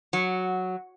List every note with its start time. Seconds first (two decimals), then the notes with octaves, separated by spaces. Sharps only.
0.13 F#3